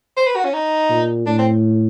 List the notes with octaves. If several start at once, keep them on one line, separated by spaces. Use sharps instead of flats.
C5
B4
F#4
C#4
D#4
A#2
A2 D4
C4